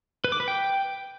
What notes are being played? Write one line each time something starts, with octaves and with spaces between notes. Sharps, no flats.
B4
D6
B4
G5